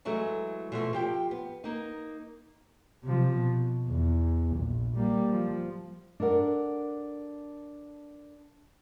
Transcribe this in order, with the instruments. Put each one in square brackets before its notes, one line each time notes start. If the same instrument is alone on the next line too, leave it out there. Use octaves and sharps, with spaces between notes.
[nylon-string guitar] E3 F#3 G#3 A3
B2 F3 A3
F3 G4 G5
B3
A#3 D#4
[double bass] C3 F3
B2
E2
A#1
G3 A#3
F3
[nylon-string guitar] D4 A4 A#4 F#5